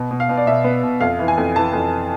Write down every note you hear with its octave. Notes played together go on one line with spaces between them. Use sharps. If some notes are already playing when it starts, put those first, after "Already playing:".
Already playing: B2
B2
F5
B2
D5
B2 E5
B3
B2
F2 F5
E3
G#5
F2
E3 A5
F2